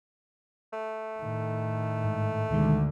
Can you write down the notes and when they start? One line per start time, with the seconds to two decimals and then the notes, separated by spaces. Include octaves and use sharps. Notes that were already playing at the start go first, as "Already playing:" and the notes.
0.73 A3
1.19 A2 D#3
2.04 G#2
2.51 D2 B2 D3 D#3 G#3